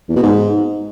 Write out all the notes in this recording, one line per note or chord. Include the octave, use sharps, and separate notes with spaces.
E2
B2
G#2